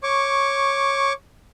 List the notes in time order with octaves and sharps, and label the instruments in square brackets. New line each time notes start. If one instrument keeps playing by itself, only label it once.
[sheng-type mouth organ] C#5 C#6 D6